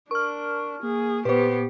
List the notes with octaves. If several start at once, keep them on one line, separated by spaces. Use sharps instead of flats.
D4 A#4 C#6 F6
A#3 G#4
A#2 B3 G4 B4 C5